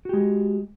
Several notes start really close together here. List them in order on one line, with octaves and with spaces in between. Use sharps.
F#4 G4 G#3